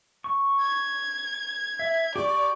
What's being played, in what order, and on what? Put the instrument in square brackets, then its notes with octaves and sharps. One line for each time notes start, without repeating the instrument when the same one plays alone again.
[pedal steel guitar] C#6
[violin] G#6
[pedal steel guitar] E5
[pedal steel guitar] G4 C#6 [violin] D5